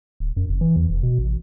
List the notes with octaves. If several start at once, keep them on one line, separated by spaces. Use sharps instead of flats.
D1
F#2
F#1
E3
E2
E1
B2
A1